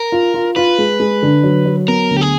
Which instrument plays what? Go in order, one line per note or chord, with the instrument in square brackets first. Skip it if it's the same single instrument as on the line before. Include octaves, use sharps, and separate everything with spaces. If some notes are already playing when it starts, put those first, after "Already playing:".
Already playing: [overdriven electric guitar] A#4
[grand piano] F4
F4
[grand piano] F4 [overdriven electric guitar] B4
[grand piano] G#3
G#3
D3
F#3
F#3
[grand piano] B3 [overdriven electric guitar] A#4
[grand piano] D2
[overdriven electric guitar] G4
G#4